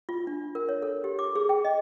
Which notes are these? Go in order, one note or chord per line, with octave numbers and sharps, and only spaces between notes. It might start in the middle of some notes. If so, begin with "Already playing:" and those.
F4
D4
A#4
C#5
A4
G4
D6
G#4
G5
D#5